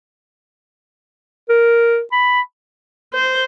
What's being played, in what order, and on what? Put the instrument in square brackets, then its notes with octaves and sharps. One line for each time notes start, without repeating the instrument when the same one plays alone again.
[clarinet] A#4
B5
[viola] C5